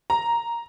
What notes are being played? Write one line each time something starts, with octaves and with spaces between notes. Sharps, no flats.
A#5